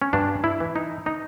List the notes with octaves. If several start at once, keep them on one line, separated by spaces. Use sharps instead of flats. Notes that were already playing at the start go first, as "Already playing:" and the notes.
C#4
G2 D4
E4
E3
D#4
D#4